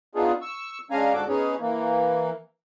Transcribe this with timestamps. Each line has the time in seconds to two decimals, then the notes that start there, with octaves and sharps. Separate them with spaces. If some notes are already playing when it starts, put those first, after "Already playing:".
0.15 B3 D4 D#4 F4 G#4
0.42 C#6 E6
0.91 G#3 C#4 D4 F5 G#5 A#5
1.13 G#2 D3 F#4 A4 D6
1.28 B3 C#4 D#4 G#4 C#5
1.60 E3 A#3